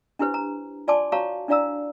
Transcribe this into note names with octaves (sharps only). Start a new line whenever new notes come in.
D4 E4 G4 B4 C5
A#5
F4 D5 G#5 A5 C6 D6
F#4 C#5 F5 A5 A#5 C#6
D4 E4 D5 F5 A#5 E6